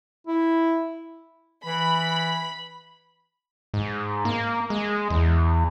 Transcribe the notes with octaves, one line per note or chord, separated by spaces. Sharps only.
E4
E3 B5
G#2
A#3
G#3
E2